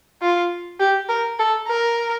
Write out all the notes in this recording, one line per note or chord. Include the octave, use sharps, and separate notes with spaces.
F4
G4
A#4
A4
A#4